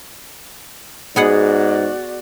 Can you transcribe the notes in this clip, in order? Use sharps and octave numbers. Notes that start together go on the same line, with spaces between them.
G#2 B3 F#4 G#4 D5 F#5